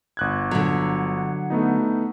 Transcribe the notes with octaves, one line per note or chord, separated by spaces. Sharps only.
G1 F#6 G#6
D3 F#3
A3 B3 D#4